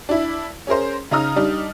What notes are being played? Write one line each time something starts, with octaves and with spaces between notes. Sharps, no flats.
D4 E4
C#4 G#4 A#4 C5
C#3 D#4 A#5 D#6 F6
G3 D4 D#4